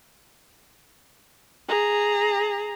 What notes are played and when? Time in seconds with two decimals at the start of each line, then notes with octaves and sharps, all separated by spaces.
1.68 G#4 A#5